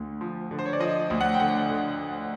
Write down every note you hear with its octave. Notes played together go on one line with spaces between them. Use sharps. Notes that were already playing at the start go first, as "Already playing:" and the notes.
Already playing: D2 D3
F3
D3
C5
C#5
D5
F3 D#5
D2
F#5
G5
D3 F#5
D3